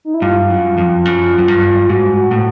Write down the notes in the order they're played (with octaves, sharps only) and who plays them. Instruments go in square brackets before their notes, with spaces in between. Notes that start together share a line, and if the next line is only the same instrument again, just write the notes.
[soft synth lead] D#4
E4
[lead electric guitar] G2 [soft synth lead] F4
[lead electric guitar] F#2
F2
F#2
F#2
G2
[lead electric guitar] G#2 [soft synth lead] F#4
[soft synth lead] F#4
[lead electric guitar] A2